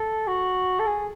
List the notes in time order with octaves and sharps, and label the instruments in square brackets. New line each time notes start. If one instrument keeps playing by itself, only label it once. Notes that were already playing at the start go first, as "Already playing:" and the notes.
Already playing: [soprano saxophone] A4
F#4
A4
G#4